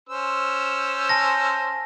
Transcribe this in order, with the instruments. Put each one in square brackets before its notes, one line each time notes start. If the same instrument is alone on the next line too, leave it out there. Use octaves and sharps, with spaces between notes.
[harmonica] C#4 C5 E6
[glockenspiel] G#5 A5 A#6